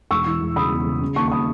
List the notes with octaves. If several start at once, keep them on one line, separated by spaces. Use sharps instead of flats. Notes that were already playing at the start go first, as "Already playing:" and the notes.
E1 C#6 E6
E3
E1
C#3 B5 D#6
E2
C#3
C#3
D#2 A5 C#6
C#6
B5 D#6